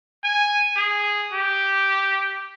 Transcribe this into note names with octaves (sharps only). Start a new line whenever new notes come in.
G#5
G#4
G4